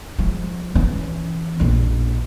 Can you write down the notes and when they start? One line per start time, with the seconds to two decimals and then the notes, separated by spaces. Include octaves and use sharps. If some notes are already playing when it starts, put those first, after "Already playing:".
0.19 F3 G#3
0.75 E3 C#4
1.60 A#1 F2